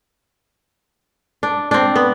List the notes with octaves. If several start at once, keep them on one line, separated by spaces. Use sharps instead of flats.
D4
C4 D4
B3